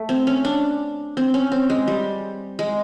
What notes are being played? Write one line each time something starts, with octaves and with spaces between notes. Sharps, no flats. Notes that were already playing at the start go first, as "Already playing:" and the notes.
Already playing: A3
C4
C#4
D4
C4
C#4
C4
G#3
G3
G#3